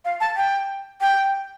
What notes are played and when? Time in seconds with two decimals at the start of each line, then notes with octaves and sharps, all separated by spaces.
0.05 F5
0.20 A5
0.36 G5
1.01 G5